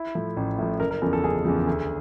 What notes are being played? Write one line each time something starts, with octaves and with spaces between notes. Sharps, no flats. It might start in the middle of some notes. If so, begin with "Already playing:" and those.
Already playing: E4
A2 F3
A1
A2 F3
F#1 A#4
A#4
E2 C#3 F3 A4
A4
F#1 G#4
E2 C#3 F3
D2